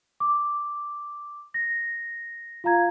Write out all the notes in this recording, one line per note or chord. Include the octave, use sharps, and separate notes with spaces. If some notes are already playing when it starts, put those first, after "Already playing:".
D6
A#6
F4 F5 A#5 G#6